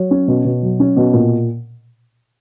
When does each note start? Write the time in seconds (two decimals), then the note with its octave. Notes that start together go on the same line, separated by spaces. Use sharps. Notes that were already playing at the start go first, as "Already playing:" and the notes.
Already playing: F#3 C#5
0.11 C#4
0.28 B2
0.45 B2
0.62 F#3
0.80 C#4
0.97 B2
1.13 A#2